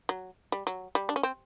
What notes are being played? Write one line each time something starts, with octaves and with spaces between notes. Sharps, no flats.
F#3
G3
F#3
G3
D4
C#4
C4